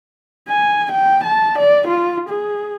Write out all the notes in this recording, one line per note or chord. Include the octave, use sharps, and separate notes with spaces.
G#5
G5
A5
D5
F4
G#4